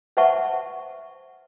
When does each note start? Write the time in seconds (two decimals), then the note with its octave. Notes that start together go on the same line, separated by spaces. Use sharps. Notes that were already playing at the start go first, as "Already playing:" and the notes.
0.17 B4 C5 E5 F#5 A5 C#6